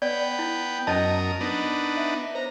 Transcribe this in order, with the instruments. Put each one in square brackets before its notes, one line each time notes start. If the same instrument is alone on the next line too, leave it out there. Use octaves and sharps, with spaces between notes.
[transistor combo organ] B3 G5 [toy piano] D5
[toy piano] E4
[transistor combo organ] F#2 A#4 D#6 [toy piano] C#4 D#5 A5
[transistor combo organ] B3 D4 D#4
[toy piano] E5
[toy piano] C5 [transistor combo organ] A#5